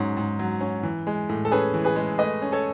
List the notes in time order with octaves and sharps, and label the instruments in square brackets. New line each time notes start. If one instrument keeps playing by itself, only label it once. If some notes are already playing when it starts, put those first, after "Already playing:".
Already playing: [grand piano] G#2 F#3 C#4
G#2
F#3
C#4
E3
G#3
A2
A4
C#4 G#4 B4
E3
G#4 B4
G#3
A3 B4 D#5
C#4
A4 C#5